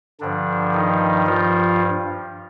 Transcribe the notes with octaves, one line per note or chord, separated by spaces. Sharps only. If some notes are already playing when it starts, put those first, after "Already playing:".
G2 D3 F3 D4
D#3 D#4
F3 F4